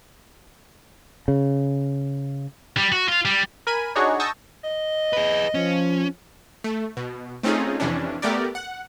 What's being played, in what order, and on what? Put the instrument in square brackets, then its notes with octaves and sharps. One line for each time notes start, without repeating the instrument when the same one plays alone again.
[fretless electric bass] C#3
[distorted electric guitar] G3
F#4
F4
G3
[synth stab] A#4 G#5 B5 D#7
D4 D#4 F#4 G#4 C#5
A5 C#6 D#6 E6 G6 A#6
[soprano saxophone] D#5
[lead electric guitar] G#4 B4
[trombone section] F3 [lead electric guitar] C#4
[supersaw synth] A3
B2
A3 C4 C#4 D#4 F4 G#4
F2 C3 E3 C#4 D4
A3 B3 G4 A#4 D5
F#5